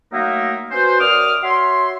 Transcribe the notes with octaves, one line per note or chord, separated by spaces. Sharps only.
F#3 A3 A#3 D#4 A#4 E5
C#4 F#4 B4 C5
F#2 D5 D6 D#6 F6
F#4 C#5 E5 C6